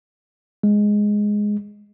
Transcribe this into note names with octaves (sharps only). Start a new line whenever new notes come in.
G#3